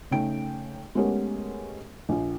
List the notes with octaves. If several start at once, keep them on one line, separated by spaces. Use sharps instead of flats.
C#3 A3 D#4 G5 D7
G#3 A3 B3 C#4 G4 A#4
A#1 F4